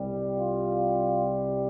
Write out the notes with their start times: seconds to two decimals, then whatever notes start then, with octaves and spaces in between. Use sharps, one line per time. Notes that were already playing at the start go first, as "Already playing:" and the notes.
Already playing: C2 C3 G3
0.37 F4